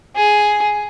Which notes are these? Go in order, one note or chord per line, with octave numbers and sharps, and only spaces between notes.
G#4